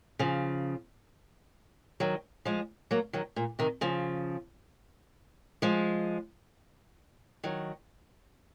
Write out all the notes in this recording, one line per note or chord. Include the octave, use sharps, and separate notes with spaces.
C#3 F3
D#3 F#3
F3 G#3
F#3 A#3
D#3 F#3
A#2
C3 D#3
C#3 F3
F3 G#3
D#3 F#3